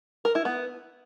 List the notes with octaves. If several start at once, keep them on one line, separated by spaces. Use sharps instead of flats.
A#4
E4
B3